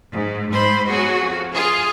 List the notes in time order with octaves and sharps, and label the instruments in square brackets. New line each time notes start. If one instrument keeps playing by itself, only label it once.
[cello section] G#2
[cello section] G#2 [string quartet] C5 B5 C6
[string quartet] B2 F#3 G#4 [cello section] F#4
[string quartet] F2
[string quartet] F4 F5 [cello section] G#4